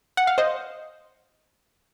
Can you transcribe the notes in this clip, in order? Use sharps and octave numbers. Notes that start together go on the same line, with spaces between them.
F#5
F5
C5 D#5